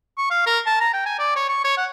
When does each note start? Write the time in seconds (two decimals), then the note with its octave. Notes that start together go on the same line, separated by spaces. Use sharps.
0.18 C#6
0.31 F5
0.47 A#4
0.67 A5
0.81 A#5
0.93 G5
1.06 G#5
1.19 D5
1.36 C#5
1.49 C#6
1.65 C#5
1.77 F#5